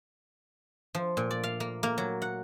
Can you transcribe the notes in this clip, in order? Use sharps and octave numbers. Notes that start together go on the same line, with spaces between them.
F3
A#2
D5
F5
A#3
A#3
F#3
F#5